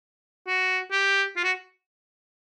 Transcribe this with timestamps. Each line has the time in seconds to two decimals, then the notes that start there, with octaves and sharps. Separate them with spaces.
0.48 F#4
0.92 G4
1.37 F4
1.44 F#4